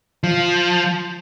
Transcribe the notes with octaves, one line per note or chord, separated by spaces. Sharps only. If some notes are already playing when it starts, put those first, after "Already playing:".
F3